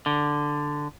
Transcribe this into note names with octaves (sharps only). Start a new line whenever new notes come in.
D3